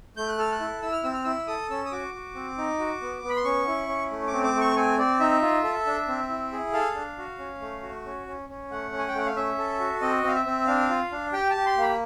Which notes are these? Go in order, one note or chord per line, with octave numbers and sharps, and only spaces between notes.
A3 G6
F#6
A4 F6
F#6
E4
E4 E6
F6
C4 E6
F6
E4 E6
A4 D#6
C#4 E6
D#6
F#4 D6
F#4
C4
D#4
F#4
B3
B3
B5
C6
C#4 C#6
E4
C#4
A3
D6
C4
D6
A3
C#6
C4 G#5
C4 D5
D#4 E5
F4
A4
D4
C4
E4
G#4
A4 F5
D4
F#4
C#4
A3
F#4
C#4
C#4
C#4
A3 F#5
C#4
G#5
G5
A3 F#5
F5
C#4 E5
A4
F#4
C4 D#5
C4 F5
E5
C4
D4 F5
F4
D4
G4 G5
A5
G4
C6
A#3 B5